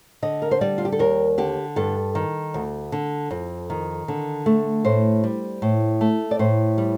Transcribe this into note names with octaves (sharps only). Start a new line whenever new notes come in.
D3 D#5
A#4
C5
G3 D5
F4
G4
A4
D#2 A#4
D3 G4
G2 A4
D#3
D2
D3
F2
D#3
D3
A3
A2 C5
G3
A2
A3
D5
A2 C5
G3